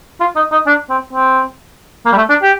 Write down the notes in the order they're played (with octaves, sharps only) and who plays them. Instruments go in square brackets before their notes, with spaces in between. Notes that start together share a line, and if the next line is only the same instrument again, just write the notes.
[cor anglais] F4
D#4
D#4
D4
C4
C4
A#3
G3
A3
D4
G4